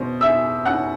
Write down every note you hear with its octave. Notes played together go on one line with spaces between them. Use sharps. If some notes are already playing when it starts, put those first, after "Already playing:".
Already playing: B2 C5
E5 E6
F#5 F#6